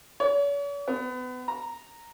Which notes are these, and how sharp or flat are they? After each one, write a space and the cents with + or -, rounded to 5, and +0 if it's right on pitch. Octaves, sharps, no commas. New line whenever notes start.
C#5 +45
B3 +30
A#5 -5